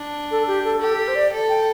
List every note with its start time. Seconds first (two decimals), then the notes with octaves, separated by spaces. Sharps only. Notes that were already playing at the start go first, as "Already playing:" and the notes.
Already playing: D4
0.31 A4
0.47 G4
0.65 A4
0.81 G4 A4
0.98 A4
1.08 C5
1.15 D5
1.32 A4
1.49 G5